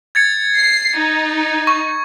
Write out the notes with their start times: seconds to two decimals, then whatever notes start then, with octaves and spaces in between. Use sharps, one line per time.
0.15 G#6 A6 C#7
0.56 C7
0.98 D#4
1.67 C#6